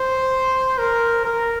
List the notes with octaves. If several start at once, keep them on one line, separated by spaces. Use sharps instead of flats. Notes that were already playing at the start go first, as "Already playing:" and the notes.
Already playing: C5
A#4
A#4